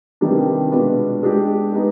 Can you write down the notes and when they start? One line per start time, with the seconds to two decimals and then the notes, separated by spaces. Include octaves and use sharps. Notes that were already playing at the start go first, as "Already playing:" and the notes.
0.21 C3 D#3 G3 B3 D4
0.72 B2 G#3 D4 F4 B4
1.23 G#3 D4 G4
1.73 G#3 B3 D#4